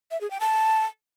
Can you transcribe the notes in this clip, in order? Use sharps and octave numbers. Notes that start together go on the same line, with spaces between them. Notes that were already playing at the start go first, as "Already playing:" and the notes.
E5
G#4
G5
A5